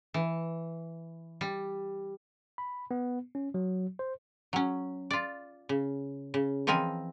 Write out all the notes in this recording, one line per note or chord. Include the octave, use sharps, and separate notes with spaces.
E3
G3
B5
B3
C#4
F#3
C5
F#3 C#4
F4 D5
C#3
C#3
E3 F3 C4 A#4 D#5 G#5